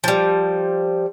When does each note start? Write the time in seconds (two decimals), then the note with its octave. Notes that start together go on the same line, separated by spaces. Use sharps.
0.04 F3 G3